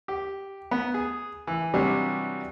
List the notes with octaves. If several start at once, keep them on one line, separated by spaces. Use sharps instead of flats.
G4
B3
G#4
E3
C3 E3 F#3 G3 D4